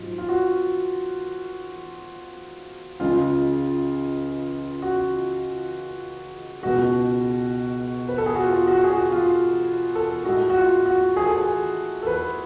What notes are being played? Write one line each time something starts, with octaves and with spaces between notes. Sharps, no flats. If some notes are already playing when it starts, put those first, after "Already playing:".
Already playing: G#2 F#3 F4
F4
F#4
C#2 C#3 G#3 F4
F#4
C#2 B2 G#3 F#4
B4
A4
G#4
F#4
F4
F#4
G#4
F#4
F4
A4
A2 G#3 F#4
F#4
F4
F#4
G#4
A4
G#4
A4
B4